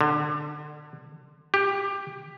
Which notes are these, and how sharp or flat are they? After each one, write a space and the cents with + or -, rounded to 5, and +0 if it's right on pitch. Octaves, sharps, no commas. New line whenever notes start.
D3 +25
G4 +15